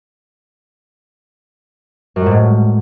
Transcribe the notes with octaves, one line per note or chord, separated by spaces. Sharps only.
F#2
G3
G#2
A2